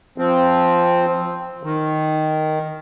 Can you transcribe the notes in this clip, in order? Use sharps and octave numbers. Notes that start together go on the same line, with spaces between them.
F3 C4
D#3